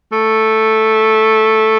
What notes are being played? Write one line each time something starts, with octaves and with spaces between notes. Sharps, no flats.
A3